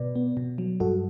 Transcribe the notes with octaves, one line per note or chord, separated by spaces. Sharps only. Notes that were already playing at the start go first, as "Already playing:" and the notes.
Already playing: B2 B4 D5
B3
B2
F#3
G2 F#4 A4